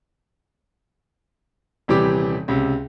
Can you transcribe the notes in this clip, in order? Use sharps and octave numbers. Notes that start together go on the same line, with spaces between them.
D#1 C3 E3 G3 G4 D6
C#2 C3